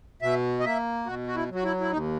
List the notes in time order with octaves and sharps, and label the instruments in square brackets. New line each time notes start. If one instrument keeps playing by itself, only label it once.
[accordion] B2 E5
D#5
A#3 E5
B2 F#4
F#4
E4
F#3
F#4
E4
E4
D#2 D#4